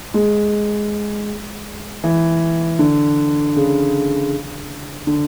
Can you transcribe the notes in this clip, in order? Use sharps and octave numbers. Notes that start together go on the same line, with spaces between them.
G#3
E3
D3
C#3
D3